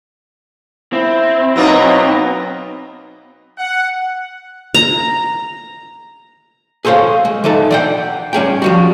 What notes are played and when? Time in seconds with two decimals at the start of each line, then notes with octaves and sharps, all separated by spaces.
0.93 C4 E4
1.56 B2 F#3 A#3 B3 D#4
3.58 F#5
4.74 A#5
6.85 G#4 A4 C5 C#5 F5
7.25 G#3
7.44 E3 D#4 A4
7.71 D5 F#5 G5
8.33 G3 C#4 G#4 G5
8.62 F3 G3 F#4